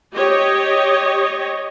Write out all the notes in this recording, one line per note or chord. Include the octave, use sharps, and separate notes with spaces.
G4 C#5 D#5